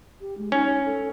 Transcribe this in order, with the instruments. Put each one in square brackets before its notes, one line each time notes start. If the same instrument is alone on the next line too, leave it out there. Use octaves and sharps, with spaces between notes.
[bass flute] G4
G#3
[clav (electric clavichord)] C#4 [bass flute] D#4
[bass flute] A4